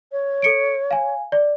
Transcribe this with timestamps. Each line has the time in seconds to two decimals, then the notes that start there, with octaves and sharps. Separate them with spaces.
0.12 C#5
0.42 A4 C#7 D7
0.91 F5 G#5
1.32 D5